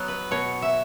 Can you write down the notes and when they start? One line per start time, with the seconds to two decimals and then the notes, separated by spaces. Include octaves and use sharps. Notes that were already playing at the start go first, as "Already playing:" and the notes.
Already playing: F#3 B3 D#5
0.08 B4
0.31 B2 C#5
0.62 E5